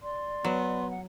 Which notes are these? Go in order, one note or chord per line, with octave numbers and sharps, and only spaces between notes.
D5 C6
F#3 B3
F#5